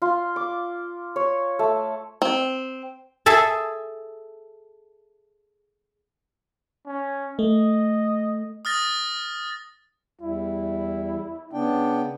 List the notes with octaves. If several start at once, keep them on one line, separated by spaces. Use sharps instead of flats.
F4
D6
C#5
A3
C4
G#4 A4 E5
C#4
A3 D#5
D#6 F6 A6 A#6
E2 G3 E4
C#3 B3 D4 G5